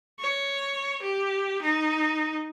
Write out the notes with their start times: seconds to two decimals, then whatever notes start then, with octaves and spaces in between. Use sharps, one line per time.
0.19 C#5
1.02 G4
1.62 D#4